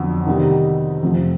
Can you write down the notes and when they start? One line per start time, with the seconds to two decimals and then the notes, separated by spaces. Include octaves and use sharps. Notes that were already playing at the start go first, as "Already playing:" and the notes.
Already playing: F2 D3 F#3 B3
0.27 C3 D#3 G3 B3 D#4
1.02 F2 C3 F3 A3 C4